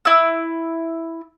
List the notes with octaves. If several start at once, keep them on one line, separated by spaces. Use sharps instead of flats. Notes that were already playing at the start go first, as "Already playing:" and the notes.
E4 E6